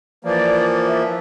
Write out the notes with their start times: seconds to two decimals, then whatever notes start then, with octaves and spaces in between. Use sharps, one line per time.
0.25 E3 F3 A#3 D5
0.87 E5